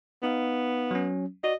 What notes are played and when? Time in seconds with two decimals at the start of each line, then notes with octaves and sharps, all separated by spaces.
0.23 B3 D#4 F5
0.91 F#3 C#4
1.44 F#4 D5 D#5